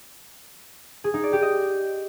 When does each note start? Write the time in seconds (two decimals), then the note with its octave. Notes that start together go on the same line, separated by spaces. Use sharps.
1.04 G#4
1.14 D#4
1.23 D5
1.33 G4
1.42 D#5